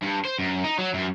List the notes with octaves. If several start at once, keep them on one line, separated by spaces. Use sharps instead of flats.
G2
C5
F#2
D#4
F#3
F#2